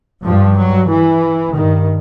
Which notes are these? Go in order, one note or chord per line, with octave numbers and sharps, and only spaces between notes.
G2 F3
F#3
E3
G2 D#3